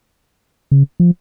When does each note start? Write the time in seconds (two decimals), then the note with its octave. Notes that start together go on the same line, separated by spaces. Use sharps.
0.72 C#3
1.00 F3